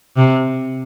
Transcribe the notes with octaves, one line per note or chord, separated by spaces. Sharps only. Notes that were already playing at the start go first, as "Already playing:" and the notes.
C3